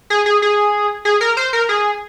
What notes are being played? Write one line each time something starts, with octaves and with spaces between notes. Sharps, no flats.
G#4
G#4
G#4
G#4
A#4
C5
A#4
G#4